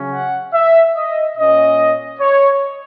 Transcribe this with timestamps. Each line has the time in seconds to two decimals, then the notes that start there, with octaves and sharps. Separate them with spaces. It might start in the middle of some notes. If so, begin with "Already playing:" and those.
Already playing: C#3 F#3 C#4
0.12 F#5
0.54 E5
0.96 D#5
1.37 A#2 A#3 C#4 D#5
2.19 C#5